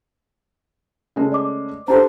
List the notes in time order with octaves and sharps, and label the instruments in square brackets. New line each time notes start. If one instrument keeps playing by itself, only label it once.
[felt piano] C#3 G#3 A3
[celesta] D5 D#5 D6
[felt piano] D4 G4 A4 [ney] C5 [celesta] A#5